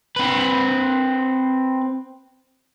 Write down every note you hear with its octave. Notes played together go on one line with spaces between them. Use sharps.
C4 B4